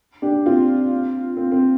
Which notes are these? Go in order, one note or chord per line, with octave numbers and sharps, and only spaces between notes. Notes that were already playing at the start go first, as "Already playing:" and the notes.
D4 G4
C4 F4
C4
C4